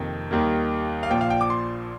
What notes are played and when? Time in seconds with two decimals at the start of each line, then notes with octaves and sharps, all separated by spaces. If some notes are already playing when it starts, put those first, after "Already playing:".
Already playing: F2 C3 D#3 A#3
0.31 D#2 D#3 G3 A#3
1.03 F5
1.10 A#1 A#2 F3 G5
1.21 F5
1.30 G5
1.41 D6
1.50 C6